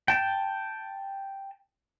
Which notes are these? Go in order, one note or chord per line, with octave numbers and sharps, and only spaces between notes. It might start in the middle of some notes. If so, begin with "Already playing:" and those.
G5 A5